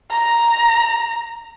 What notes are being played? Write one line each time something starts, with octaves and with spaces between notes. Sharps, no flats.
A#5